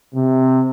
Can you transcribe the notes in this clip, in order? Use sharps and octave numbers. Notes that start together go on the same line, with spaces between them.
C3